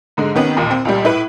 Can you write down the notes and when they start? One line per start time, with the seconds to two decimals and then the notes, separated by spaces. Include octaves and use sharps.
0.17 G#2 D3 G#3
0.35 C3 D#3 B3 C#4
0.57 A1 D#2 A#2
0.71 C4
0.85 C#2 A#2 G3
1.04 A2 E4 B4